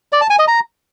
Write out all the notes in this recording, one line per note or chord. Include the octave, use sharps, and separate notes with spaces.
D5
A5
G#5
D#5
A#5